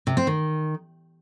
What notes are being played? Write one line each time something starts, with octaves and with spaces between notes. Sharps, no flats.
C3
C4
D#3